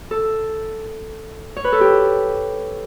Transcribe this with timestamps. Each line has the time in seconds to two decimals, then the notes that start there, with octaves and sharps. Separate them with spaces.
0.11 A4
1.57 C#5
1.64 B4
1.72 A4
1.81 G4